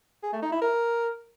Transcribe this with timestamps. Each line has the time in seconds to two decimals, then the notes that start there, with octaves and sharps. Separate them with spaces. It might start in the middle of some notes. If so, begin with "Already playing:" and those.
0.23 G#4
0.33 A3
0.42 D#4
0.52 E4
0.62 A#4